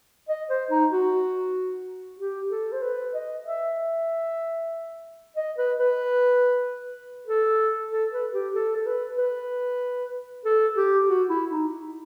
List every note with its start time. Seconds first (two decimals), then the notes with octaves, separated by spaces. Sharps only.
0.29 D#5
0.50 C5
0.70 D#4
0.92 F#4
2.19 G4
2.51 A4
2.72 C5
2.82 B4
3.14 D#5
3.46 E5
5.37 D#5
5.58 B4
5.79 B4
7.27 A4
7.91 A4
8.12 B4
8.33 G4
8.54 A4
8.76 A4
8.86 B4
9.18 B4
10.45 A4
10.77 G4
11.09 F#4
11.30 E4
11.51 D#4